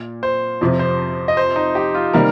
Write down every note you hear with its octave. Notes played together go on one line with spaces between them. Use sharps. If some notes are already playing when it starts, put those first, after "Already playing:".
Already playing: A#2
C5
F2 C3 F3
C5
D#5
C5
D#4
G4
F4
C3 D#3 G3 A#3 D#4 A#4